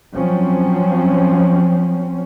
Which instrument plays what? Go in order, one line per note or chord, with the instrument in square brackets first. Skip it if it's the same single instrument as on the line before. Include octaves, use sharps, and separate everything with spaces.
[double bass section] F3 F#3 C4 C#4